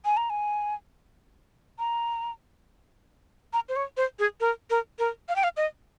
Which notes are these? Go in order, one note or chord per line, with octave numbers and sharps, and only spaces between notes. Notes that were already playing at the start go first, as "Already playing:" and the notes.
G#5
A#5
G#5
A#5
A#5
C5
C#5
C5
G#4
A#4
A#4
A#4
F5
G5
F5
D#5